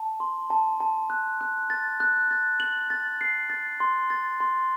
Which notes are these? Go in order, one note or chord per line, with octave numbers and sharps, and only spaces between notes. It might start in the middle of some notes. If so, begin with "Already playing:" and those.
Already playing: A5
C6
A5
A5
F#6
F#6
A6
F#6
A6
F#7
A6
C7
A6
C6
A6
C6